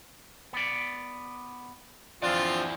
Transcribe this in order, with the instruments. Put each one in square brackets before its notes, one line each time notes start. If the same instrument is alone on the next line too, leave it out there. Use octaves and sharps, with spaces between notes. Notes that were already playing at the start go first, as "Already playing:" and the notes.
[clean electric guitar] B3 D5
[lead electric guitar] E3 D5 [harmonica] F3 C4 F4 [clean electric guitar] D4